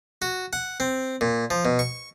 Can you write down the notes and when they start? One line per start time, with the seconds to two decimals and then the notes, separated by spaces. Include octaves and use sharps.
0.22 F#4
0.53 F#5
0.80 C4
1.21 A#2
1.50 F3
1.65 B2
1.79 C#6